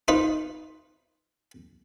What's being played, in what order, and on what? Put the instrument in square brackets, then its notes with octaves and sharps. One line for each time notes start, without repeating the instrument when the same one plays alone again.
[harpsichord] D#4 F4 B4